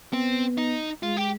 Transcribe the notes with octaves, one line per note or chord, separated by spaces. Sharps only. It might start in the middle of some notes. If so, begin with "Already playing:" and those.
B3 C4
D#4
G#3 F4
G4